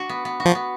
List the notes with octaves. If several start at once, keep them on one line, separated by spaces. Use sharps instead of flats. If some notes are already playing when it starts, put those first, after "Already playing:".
Already playing: D4 F#4
B3
B3
F#4
F3
B3